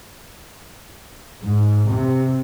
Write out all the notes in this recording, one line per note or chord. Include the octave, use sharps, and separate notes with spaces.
G#2
C3